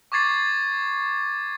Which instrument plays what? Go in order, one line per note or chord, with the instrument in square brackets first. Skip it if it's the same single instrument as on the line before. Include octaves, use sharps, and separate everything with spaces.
[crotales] C#6 D6 G#6 A6 C7